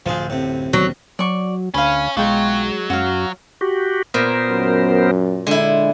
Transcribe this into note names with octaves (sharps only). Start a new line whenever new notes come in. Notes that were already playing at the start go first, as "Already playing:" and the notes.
D1 F#2 F3 F4 G#4
A2 C3
D#2 B2 D3 F#3
F#3 D5 C#6
D2 C#4 F5 B5
B1 F#3 G#3 F4 G5 C#6
F#2 F#4 F5
F#4 G4
A#2 B3 A#4 C5
F#2
D3 G#3 E4